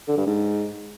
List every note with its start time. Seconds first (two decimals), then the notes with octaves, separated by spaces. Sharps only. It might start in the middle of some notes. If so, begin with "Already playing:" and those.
0.08 D3
0.17 G2
0.27 G#2